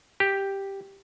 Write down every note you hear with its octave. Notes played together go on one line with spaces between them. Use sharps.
G4